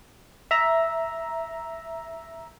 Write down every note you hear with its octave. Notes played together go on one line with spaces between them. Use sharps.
E5 A#5